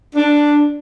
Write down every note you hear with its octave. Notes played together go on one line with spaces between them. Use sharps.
D4